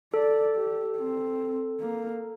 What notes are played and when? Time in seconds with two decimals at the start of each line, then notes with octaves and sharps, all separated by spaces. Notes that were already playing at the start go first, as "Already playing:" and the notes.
0.13 A4 D5
0.56 G4
0.97 C4
1.81 A#3